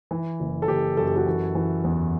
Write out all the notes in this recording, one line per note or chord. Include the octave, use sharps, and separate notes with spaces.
E3
F#1
A4
F#1 G4
F#2 A4
G4
F#4 A4
E3
E3
E2